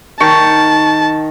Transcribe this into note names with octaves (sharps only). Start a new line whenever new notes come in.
D#3 A5 C#6